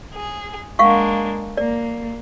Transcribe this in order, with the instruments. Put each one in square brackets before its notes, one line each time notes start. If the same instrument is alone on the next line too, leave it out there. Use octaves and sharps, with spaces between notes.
[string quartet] G#4
[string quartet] G#3 A#3 D4 [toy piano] F5 F#5 C#6
[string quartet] A#3 [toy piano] D5